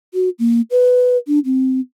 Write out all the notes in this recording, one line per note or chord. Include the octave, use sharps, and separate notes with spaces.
F#4
A#3
B4
D4
C4